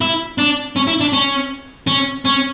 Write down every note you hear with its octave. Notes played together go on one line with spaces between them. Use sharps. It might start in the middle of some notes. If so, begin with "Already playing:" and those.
E4
D4
C#4
E4
D4
C#4
C#4
C#4